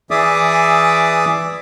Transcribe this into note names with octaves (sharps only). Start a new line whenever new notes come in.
E3 G#4 D5 E5 D6 D#6